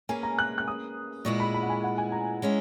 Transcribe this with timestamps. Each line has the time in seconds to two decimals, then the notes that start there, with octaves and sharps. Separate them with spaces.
0.09 A#3 C#4 G#4 B4 G#5
0.23 A#5
0.39 F#6
0.58 F#6
0.68 D#6
1.25 A#2 G#3 B3 E4 C#6
1.40 B5
1.54 B5
1.63 F#5
1.69 G#5
1.84 F#5
1.98 G#5
2.12 A#5
2.42 G#3 C#4 E4